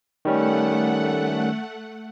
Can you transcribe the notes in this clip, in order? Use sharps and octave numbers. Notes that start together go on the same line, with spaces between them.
D#3 G3 A3 C#4 F#5